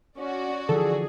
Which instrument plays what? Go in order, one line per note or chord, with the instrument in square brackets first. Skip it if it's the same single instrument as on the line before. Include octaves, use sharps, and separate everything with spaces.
[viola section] C#4 [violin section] F#4 D5
[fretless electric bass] D3 E3 F3 [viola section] G#4 [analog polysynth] A4